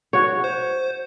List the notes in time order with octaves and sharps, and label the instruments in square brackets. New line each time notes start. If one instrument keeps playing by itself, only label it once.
[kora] F#4 C#5
[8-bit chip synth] C5